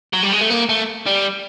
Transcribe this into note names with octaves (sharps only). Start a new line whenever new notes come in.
F#3
G3
G#3
A3
A#3
A3
G3